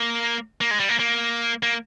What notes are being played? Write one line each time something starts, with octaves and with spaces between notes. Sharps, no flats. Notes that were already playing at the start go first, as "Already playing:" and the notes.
Already playing: A#3
A#3
G#3
G3
A#3
A#3
A#3